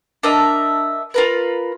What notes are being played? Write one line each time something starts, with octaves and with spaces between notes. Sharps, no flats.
D4 A#4 D#5 E5
F4 A#4 B4